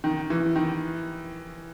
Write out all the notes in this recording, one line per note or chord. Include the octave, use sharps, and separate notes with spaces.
D#3
E3
D#3